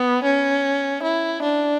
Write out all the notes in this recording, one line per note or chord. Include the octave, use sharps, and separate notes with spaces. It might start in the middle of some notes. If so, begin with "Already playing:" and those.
Already playing: B3
C#4
E4
D4